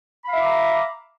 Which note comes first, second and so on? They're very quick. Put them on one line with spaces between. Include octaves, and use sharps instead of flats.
B5 F5 E5 D6 A#5